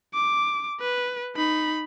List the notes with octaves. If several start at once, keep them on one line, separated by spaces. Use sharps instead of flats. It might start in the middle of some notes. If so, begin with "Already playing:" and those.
D6
B4
D#4 B5